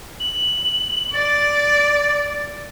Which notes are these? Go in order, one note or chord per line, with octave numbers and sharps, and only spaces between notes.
F#7
D5 A6